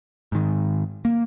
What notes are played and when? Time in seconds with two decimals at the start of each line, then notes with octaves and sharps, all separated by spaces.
0.32 G#2 D#3
1.05 A#3